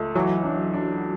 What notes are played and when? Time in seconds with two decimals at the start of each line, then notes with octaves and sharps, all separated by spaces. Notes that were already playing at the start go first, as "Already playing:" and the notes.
Already playing: C#2 A3
0.15 E3 F#3
0.44 D4
0.73 D4